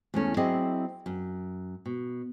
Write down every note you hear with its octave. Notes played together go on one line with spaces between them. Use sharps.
E2 A3 C#4
F#3 C4 E4 G#4 D5 D#5
F#2
B2